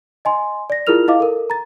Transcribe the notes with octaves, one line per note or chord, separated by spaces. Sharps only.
D#5 G#5 C6
D5 A#6
E4 F4 G#4 A#4 F6 F7
E4 D#5 F5 D6
A4 A#4
A#5 A6